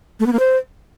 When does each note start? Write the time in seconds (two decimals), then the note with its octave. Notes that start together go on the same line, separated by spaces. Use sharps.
0.20 A3
0.26 B3
0.33 A#3
0.39 C5